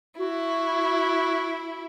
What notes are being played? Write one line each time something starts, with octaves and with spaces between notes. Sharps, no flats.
E4 F#4